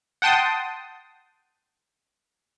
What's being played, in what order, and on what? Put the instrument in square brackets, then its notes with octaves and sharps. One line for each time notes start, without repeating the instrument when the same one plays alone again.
[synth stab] F#5 G5 A5 C6 D#6